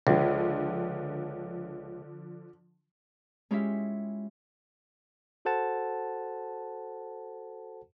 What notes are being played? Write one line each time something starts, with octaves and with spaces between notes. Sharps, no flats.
C#2 D3 F3
G#3 C#4 E4 F4 G4 E5
F#4 A4 C5 F#5 A5